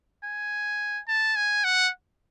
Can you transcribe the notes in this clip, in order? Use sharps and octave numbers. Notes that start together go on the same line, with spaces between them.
G#5
A5
G#5
F#5